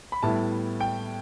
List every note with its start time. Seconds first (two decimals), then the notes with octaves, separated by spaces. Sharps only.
0.12 B5
0.23 A2 G3 B3 E4 A5
0.80 G5